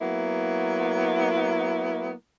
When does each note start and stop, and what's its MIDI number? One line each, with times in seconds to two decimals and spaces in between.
0.01 2.12 54
0.01 2.12 58
0.01 2.12 59
0.01 2.12 64